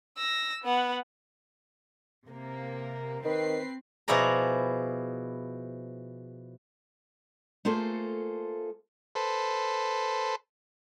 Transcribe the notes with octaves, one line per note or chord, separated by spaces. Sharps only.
E6 A#6
B3 F#5
C3 A#3
D#3 C4 B4 C7
B2 F3 E4 G#4 D5 A#5
A3 A#3 F4 G#4 A4 C5
A4 B4 C5